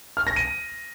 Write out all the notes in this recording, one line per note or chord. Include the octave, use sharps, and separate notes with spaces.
F6
A#6
D#7